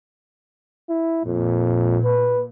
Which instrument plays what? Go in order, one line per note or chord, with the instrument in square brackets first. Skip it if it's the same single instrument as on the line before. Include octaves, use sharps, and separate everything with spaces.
[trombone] E4
[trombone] F2 [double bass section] A#2
[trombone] B4